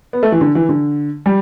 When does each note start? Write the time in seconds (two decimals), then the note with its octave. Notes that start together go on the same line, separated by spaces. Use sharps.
0.13 B3
0.23 A3
0.32 E3
0.41 D3
0.55 E3
0.69 D3
1.26 G3